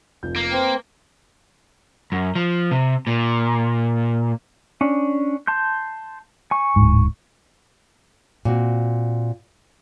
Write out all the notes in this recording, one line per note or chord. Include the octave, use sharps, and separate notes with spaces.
F1 F3 G6
A#3
C4 B4
F#2
F3
C3
A#2
C#4 D4
A5 C6 G6
G#5 C#6
D1 G#2
A#2 C4 F#4